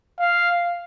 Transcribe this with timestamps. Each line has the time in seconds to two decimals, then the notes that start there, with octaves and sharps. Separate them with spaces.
0.19 F5